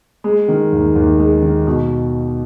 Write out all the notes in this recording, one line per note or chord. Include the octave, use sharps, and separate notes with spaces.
G#3
D#3
D#2
D#2
G#3
D#3
B2